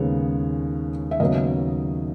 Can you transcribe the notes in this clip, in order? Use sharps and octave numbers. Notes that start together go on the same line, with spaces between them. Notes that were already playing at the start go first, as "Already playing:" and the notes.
Already playing: D#2 C#3 G#3 B3 C#5
E5
D#2 C#3 F#3 B3 D#5